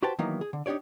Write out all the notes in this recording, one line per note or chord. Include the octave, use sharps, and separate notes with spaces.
F#4 G4 B4 C5 G5 A5
D#3 E3 F#3 A#3 B3 D#4
G#4
D3
D4 D#4 G4 C#5 D5